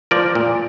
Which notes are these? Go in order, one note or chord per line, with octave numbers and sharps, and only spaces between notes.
F3 A#4 D5
A#2